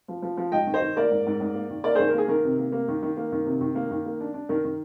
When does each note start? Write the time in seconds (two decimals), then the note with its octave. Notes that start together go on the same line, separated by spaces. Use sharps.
0.08 F3
0.22 F3
0.37 F3
0.52 G#2 D#5 G5
0.67 D#3
0.74 C5 D#5
0.81 D#3
0.96 A#3 A#4 D5
1.11 G#2
1.26 G#2
1.40 G#2
1.55 A#3
1.70 D#3
1.84 A#3 A#4 D5
1.95 D#3 G#4 C5
2.07 A#4
2.14 A#3 G#4
2.28 D#3 A#4
2.44 C3
2.59 A#3
2.72 A#3
2.88 D#3
3.02 D#3
3.17 A#3
3.32 D#3
3.46 C3
3.61 D#3
3.75 A#3
3.91 D#3
4.06 A#3
4.20 D4
4.34 D4
4.49 D#3 A#4
4.65 D#3